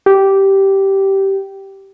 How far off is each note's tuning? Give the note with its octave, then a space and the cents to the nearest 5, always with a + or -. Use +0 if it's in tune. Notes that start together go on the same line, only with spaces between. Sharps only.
G4 -10